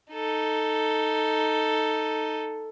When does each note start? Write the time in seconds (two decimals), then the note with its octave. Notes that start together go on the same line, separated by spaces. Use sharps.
0.13 D#4 A4